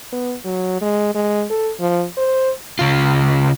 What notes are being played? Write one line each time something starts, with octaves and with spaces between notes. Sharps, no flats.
B3
F#3
G#3
G#3
A4
F3
C5
C#3 F4